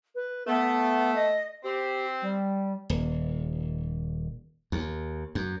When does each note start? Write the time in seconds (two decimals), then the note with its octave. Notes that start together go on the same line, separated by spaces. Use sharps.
0.15 B4
0.47 A3 B3
1.15 D#5
1.64 C4 G4
2.22 G3
2.90 D#1
4.72 D#2
5.35 F#2